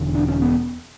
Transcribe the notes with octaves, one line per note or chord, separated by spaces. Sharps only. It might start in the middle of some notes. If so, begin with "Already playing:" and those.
Already playing: E1 E2 D3
D4
C#4
B3